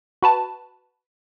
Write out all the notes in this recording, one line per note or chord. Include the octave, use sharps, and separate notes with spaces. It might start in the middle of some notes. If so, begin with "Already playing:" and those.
F#4 B4 A5